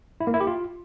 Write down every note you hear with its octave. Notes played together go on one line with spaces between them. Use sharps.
E4
A#3
E4
G4
F4